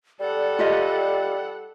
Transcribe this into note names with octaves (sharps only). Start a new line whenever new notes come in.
G3 A4 D5 F#5
F4 G4 D#5